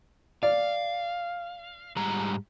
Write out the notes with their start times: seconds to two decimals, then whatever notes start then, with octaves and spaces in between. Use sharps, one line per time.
0.43 D5 F5
1.96 G#2 G3 A#5